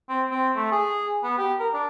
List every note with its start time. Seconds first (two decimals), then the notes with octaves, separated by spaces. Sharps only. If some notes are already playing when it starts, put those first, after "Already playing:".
0.09 C4
0.30 C4
0.56 A3
0.72 G#4
1.24 B3
1.38 G4
1.59 A#4
1.74 D4